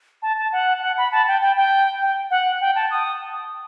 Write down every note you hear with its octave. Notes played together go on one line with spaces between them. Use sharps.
A5
A5
F#5
F#5
B5
A5
G5
G5
G5
G5
F#5
G5
A5
D#6